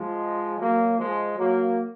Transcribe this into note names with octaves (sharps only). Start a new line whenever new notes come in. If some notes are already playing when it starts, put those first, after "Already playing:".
Already playing: F3 G#3
F#3 A#3
F3 G#3
F#3 A#3